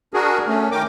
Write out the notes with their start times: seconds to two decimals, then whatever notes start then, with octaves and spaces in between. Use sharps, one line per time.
0.14 D4 F#4 G#4 A#4
0.47 A3 C#4
0.72 D#3 A#4 G5 D6